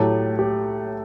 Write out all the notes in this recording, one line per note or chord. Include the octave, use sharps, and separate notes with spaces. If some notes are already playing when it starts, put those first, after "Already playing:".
Already playing: A2 F#3 A3 G4
G4